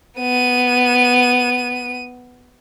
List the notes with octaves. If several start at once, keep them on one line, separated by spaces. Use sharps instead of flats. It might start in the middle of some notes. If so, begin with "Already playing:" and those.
B3 D#7